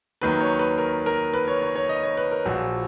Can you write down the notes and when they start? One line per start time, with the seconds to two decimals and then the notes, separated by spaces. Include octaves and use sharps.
0.22 D#2 D#3 F#3 B4
0.40 C#5
0.59 B4
0.78 A#4
1.06 A#4
1.34 B4
1.48 C#5
1.62 C#5
1.76 C#5
1.89 D#5
2.03 C#5
2.17 B4
2.31 A#4
2.45 A#1 A#2 F3 F#4